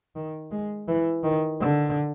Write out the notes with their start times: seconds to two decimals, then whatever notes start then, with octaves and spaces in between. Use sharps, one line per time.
0.16 D#3
0.51 G#3
0.88 E3
1.23 D#3
1.60 D3